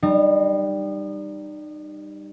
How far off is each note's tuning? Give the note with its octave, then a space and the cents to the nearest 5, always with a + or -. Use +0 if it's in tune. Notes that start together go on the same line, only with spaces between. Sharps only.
G3 +0 D#4 -35